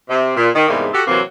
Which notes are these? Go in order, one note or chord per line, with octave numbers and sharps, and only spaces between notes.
C3
A#2
D#3
E2 G#2 C3 G3 A#3
F#4 G4 A4
C3 E3 F#3 A#3 C4